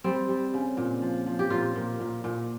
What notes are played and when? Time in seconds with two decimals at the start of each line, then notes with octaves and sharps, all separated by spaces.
0.04 G3 C4
0.29 G3
0.54 C#3
0.77 A#2
1.02 F3
1.26 F3
1.39 G4
1.50 A#2 F4
1.76 A#2
2.00 A#2
2.24 A#2